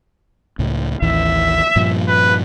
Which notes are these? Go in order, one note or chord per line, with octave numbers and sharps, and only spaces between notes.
C#2 A2
A1 D#2 E3 E5
G2 A#2 F3
B4